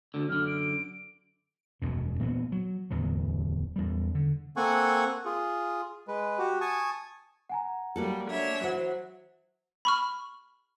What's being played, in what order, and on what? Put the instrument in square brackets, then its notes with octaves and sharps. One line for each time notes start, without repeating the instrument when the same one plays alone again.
[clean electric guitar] D2 D3
[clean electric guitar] F#2 D3 [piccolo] F6
[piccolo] D7
[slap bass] E1 F#2 B2
A#2 E3 F#3 B3
F#3
D1 E2 E3 F#3
E2 G3
D3
[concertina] A#3 C4 A4 F#5 G#5 C#6
F4 G#4
G#3 B4
F#4 G4
G#5 A5 C#6 D#6
[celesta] F#5 G#5 A#5
[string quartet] F#3 G3 [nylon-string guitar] A#3 F#4 A4
[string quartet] D4 C#5 E5
[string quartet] E3 F#3 [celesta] C5 [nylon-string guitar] F#5
[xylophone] B5 C#6 F6